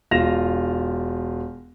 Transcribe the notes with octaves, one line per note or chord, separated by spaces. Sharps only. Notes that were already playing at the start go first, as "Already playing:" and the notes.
E1 F4 A#6 E7 F7